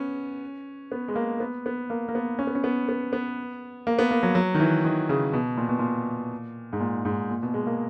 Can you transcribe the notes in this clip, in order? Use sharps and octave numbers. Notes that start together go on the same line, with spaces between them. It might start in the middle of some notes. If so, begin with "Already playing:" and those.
Already playing: B3 C#4
B3
G#3
A#3
B3
B3
A#3
A#3
B3
C#4
B3
C#4
B3
B3
B3
A#3
B3
A#3
F#3
F#3
D#3
E3
D#3
C#3
B2
A#2
B2
A#2
G#2
A#2
G#2
A#2
B2
G#3
A#3